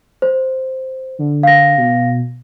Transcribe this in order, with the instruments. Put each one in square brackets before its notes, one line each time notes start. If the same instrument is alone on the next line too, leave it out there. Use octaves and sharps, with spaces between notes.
[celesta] C5
[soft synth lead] D3
[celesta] F5 A#6
[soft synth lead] B2